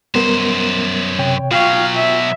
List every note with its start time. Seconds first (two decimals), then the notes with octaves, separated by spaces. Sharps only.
0.15 F#2 G3 B3 A#4 C5
1.19 C3 C#5 G5
1.51 B2 F#3 F4 F5 G5 C#6
1.96 E5